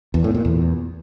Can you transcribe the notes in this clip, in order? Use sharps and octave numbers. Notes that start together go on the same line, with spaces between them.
E2
A2
A#2
E2